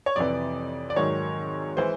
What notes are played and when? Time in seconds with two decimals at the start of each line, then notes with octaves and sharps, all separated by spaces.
0.06 C#5
0.16 F2 C3 E3 D5
0.90 D5
0.96 G#2 D#3 F#3 C#5
1.77 E3 G#3 C5